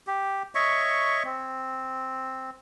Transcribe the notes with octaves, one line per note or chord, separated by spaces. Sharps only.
G4
C#5 D#5 E5 C#6
C4